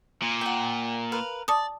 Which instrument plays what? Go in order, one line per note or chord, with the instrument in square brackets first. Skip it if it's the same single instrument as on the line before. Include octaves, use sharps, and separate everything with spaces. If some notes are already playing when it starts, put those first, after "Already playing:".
[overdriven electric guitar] A#2
[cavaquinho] F#5 G5
A#4 B4 F5
[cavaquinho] D5 [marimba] A5 D#6